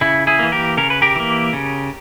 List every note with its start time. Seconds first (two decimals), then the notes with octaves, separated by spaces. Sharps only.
0.01 C#3 E4
0.27 E4 G#4
0.39 E3 A#3
0.52 G4 A#4
0.77 C#3 A#4
0.90 B4
1.02 G4 A#4
1.15 E3 A#3
1.53 C#3